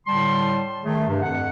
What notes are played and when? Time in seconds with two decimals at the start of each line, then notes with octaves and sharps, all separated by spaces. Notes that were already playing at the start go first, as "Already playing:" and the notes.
0.07 A2 D3 G3 A5 C6
0.83 D#3 A3 G#4
1.07 G2 C3
1.22 F2 F#5